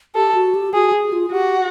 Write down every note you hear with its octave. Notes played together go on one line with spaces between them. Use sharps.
G4 A4
F#4
G4
F#4 G#4
G#4
F4
F#4 G4